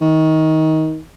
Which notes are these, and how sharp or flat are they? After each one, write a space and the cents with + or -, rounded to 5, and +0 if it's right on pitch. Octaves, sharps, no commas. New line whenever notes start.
D#3 +20